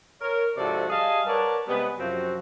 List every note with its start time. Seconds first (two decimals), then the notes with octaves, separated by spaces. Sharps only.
0.21 A#4 C#5
0.57 G#2 C3 F3 F#4 A4 D5
0.90 G3 G#4 D#5 F5 G#5 A5
1.27 A#4 B4 C#5 D5 F#5 A5
1.67 C3 G3 G#3 B3
1.97 F#2 C3 F3 C4 F#4